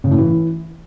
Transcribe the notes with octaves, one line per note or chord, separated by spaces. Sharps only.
C#3
A2
E3